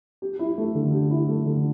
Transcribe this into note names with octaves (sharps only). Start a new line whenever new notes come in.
G4
E4
A3
D3
G4
E4
A3
D3